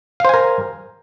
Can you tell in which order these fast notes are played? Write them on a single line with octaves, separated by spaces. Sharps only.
F5 C5 G#5 A#4